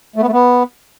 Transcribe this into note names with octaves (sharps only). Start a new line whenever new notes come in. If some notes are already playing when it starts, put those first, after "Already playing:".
A3
B3
A3
B3